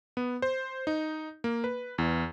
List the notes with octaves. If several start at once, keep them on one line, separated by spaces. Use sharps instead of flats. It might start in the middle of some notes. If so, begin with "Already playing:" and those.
B3
C5
D#4
A#3
B4
E2